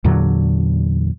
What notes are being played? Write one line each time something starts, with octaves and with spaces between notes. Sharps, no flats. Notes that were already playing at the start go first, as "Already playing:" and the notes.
E2 A#2 D3 F#3